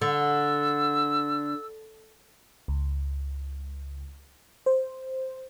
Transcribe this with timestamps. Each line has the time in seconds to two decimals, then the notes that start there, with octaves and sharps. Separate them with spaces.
0.01 D3 E6
2.68 C#2
4.66 C5